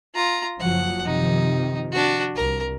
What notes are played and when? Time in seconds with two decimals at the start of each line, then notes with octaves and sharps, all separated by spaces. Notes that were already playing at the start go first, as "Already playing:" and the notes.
0.15 F4 A#5
0.60 F#1 F3 F#3 F#5
1.05 C3 D#3 F3 D#4
1.92 D4 F#4
2.35 C2 A#4